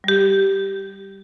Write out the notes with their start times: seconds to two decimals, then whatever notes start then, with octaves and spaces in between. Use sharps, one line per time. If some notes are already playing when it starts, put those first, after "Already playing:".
0.04 G3 G4